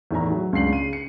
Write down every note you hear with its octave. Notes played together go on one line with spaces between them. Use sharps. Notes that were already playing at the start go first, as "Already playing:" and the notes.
E2 A2 D#3 E5 A#5
F#3
C#2 D4 C7 F#7
C#3 D#7
C#7